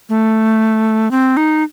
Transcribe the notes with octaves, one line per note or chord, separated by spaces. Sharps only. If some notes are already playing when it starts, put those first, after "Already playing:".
A3
C4
D#4